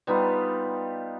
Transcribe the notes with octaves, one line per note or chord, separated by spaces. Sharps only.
G3 B3 D#4 F4